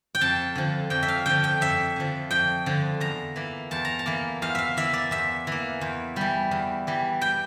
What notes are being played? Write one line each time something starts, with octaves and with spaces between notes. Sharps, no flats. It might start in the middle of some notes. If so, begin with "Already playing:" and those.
G5
F2 A5
D3 F3
F2 G5
E5
F5
D3 F3 G5
G5
F2 E5
D3 F3
F2 G5
D3 F3
E2 A#5
E3 A#3
E2 A5
A#5
A5
E3 A#3
E2 F5
E5 F5
E3 A#3 E5
D5
E2 E5
E3 A#3
E2
E3 G3
E2
E3 G3
G5